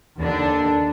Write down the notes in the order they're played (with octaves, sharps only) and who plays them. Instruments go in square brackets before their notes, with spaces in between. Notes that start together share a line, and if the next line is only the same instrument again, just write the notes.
[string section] D#2 D3 D4